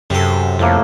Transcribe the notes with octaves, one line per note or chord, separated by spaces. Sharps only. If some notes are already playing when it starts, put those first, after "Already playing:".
F#2 C3 A4
F2 A2 A3 A#3